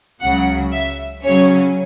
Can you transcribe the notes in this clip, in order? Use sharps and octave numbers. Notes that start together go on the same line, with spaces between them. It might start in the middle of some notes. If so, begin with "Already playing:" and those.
C#2 C#3 F#3 F#5
E5
C#3 F#3 C#4 C#5